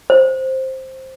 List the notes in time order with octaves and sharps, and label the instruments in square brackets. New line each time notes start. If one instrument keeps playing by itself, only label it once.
[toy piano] C5